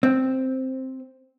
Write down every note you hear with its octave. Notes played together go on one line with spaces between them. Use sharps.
C4